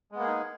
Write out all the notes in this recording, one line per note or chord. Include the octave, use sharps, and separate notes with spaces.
G#3 A#3 B3 D#4 G#4